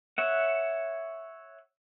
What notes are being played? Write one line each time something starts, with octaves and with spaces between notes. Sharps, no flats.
C#5 E5 F#5